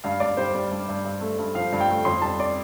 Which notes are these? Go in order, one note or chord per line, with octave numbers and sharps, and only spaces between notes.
G2 F5
G2 D5
G3 C5
G3
G2
G2
G2
A3
G2
F3 F5
G2
G5
A3
F2 C6
G3 A5
D5